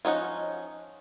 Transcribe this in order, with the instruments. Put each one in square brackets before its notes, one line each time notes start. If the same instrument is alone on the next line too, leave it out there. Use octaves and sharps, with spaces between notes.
[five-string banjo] F3 C#4 D#4 F#5